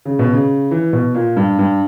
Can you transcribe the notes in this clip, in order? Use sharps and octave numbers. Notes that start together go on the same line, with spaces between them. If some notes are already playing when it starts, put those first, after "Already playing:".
C#3
B2
C#3
E3
B2
A#2
G2
G2